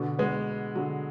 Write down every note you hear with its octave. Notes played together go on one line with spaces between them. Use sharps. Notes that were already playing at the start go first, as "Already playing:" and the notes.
Already playing: B2 D3
G#3 B3
D3 F#3